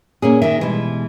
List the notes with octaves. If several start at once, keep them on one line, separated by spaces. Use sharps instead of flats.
A#2 A#3 C#4 G#4
A#2 D#3 E5
B2 E3 G3 G#3